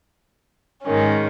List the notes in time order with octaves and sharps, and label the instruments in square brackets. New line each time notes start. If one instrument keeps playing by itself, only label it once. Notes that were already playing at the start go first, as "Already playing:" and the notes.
[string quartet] G#2 D#3 G#3 C#4